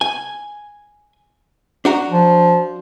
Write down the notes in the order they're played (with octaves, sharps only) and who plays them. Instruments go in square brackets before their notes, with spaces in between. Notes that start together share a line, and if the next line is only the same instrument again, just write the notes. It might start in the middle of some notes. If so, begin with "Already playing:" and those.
[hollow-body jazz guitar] G#5
D4 F#4 A#5
[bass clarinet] F3